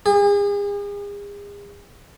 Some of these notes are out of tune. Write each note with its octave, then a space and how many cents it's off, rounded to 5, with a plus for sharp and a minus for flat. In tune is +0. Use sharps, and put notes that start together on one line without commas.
G#4 -40